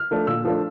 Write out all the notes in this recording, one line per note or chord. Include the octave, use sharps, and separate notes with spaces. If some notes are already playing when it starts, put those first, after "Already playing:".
Already playing: F6
F3 A3 D4
A#2 E6
F3 A3 D4